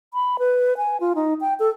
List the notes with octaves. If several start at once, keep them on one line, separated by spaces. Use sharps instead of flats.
B5
B4
G#5
F4
D#4
G5
A4